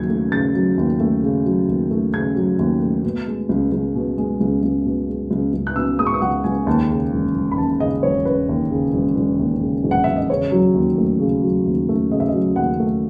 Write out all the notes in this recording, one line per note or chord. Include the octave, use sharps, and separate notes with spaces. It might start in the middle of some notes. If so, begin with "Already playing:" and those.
Already playing: D#2 C#3 F#3 G#6
A3
C#3 A6
F#3
D#2
A3
C#3
F#3
D#2
A3
C#3 G#6
F#3
D#2
A3
B2
G#3
C#2
C#2
B2
G#3
C#2
C#2
B2
G#3
C#2
C#2
F#6
B2 E6
G#3 D#6
C#6
D#6
C#2 F#5
C#2 G#5
D#2 A5
C#3
E1
E1
B5
D#2 A5
C#3 D#5
E1 C#5
E1 B4
D#2
C#3
E1
E1
D#2
C#3
E1
F#5
E1 E5
D#5
C#3 C#5
F#3
D#2
A3
C#3
F#3
D#2
A3
C#3 D#5
E5
D#5
F#3
D#2 F#5
A3